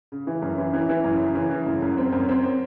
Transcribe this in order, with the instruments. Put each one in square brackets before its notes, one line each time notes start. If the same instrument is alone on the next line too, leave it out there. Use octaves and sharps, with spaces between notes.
[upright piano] C#3
E3
F#2
E3
E3
E3
F#2
C#3
E3
C#3
F#2
F#2
C4
F#2
C4